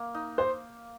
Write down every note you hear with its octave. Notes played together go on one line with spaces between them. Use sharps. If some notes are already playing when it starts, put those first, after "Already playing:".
Already playing: A#3 F5
D#4
C5